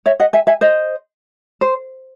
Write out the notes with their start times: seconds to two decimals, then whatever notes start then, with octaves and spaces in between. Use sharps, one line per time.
0.06 C#5 E5
0.20 D#5 F#5
0.33 E5 G#5
0.47 E5 G#5
0.61 C5 D#5
1.61 C5